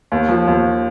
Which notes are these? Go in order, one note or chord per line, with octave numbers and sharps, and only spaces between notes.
D#2
F3
D#2